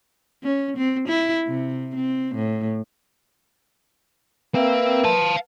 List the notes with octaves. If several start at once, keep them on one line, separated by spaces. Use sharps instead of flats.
C#4
C4
E4
C3
C4
A2
A#3 C4 B4 E5
F5 A5